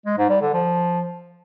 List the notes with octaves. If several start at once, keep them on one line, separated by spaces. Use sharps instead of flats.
G#3
G#2
G3
D3
F3